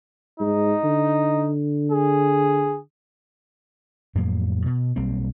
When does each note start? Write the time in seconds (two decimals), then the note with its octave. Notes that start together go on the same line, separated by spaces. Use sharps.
0.40 G#2 D#4
0.84 D3
1.92 G#4
4.15 F2 A2 F#3 A#3
4.66 B2
4.96 B1 G3 A#3 C4